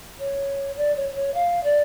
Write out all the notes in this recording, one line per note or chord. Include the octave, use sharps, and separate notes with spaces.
C#5
D5
C#5
C#5
F5
D5